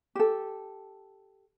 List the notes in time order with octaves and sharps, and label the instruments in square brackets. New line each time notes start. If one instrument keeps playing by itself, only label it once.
[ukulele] G4 A4